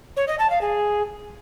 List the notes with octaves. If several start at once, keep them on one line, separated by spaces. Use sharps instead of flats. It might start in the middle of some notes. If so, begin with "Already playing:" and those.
C#5
D#5
A5
F5
G#4